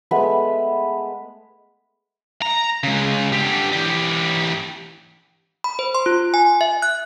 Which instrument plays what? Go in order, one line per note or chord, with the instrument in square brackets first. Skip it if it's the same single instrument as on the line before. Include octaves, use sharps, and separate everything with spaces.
[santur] G#3 A3 B3 B5
[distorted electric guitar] A#5
C#3 G#3
D3 G4
E3 G4
[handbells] B5
C5
C6
F4
G#5
E5
F#6